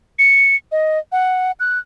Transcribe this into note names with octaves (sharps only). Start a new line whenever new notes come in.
C#7
D#5
F#5
F#6